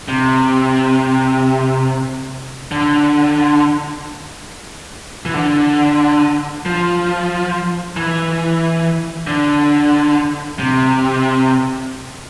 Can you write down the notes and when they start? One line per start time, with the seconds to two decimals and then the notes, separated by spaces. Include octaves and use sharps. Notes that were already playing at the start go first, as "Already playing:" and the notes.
0.08 C3
2.72 D3
5.26 E3
5.34 D3
6.66 F3
7.96 E3
9.27 D3
10.59 C3